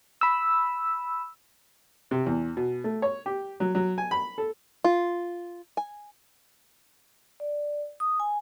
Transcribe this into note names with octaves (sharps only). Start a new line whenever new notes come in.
B5 E6
C3
E2
B2
A3
C#5
G4
F#3
F#3
G#5
B5
A4
F4
G#5
D5
D#6
G#5